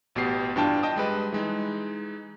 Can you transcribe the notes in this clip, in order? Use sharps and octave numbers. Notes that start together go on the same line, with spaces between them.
A1 B2 B3 G4 C7
G2 E3 D4 F4 G5 A5
D#5 G5 A5 D#6
G3 G#3 B4 D#5
E3 G#3 D#4